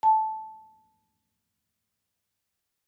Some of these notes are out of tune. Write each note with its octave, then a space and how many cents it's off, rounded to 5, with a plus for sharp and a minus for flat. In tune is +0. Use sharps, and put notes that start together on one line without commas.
A5 -10